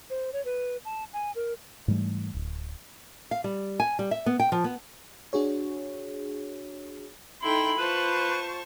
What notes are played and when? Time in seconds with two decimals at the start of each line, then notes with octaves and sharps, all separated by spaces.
0.10 C5
0.33 C#5
0.45 B4
0.85 A5
1.13 G#5
1.36 A#4
1.88 G#2 E3 G3 A3
2.35 D1
3.31 F5
3.44 G3
3.80 G#5
3.99 G3
4.11 E5
4.26 B3
4.40 G5
4.52 F3
4.64 B3
5.33 D4 F#4 G#4 C#5
7.42 D#4 E4 A4 G5 B5 C6
7.78 F4 B4 C5 A5 C#6